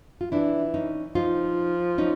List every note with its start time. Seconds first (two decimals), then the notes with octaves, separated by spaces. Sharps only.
0.21 F4
0.32 E3 D4 E4
0.74 C#4 D#4
1.15 F3 D#4 F4
1.98 C#4 D#4